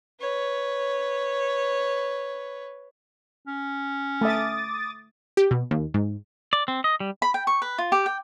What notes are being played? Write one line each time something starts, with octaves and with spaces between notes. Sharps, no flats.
B4 C#5
C#4
A3 E5 D6 D#6 A6
G4
B2
D#2
G#2
D5
C4
D#5
G3
B5
G5
C#6
B4
F4
G4
G5